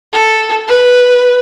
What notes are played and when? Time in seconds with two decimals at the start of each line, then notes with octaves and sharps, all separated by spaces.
0.13 A4
0.68 B4